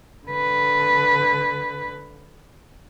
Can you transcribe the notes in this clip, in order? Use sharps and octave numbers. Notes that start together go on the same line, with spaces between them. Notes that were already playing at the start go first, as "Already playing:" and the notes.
D3 B4